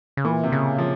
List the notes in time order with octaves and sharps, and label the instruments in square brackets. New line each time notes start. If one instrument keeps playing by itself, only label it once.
[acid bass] C#3
[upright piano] A#2 [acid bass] E3
[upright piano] C3
[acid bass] C#3
[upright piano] F3